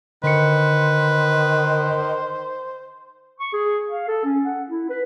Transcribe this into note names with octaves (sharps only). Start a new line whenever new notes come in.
D3 D#3 B4 C5 C#7
C#6
G#4
F5
A4
C#4
F#5
E4
B4